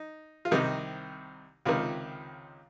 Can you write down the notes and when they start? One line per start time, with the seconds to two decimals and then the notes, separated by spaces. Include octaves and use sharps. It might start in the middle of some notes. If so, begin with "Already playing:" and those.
Already playing: D#4
0.45 F4
0.51 C2 C3 D#3 D#4
1.66 C#2 C3 D#3 F4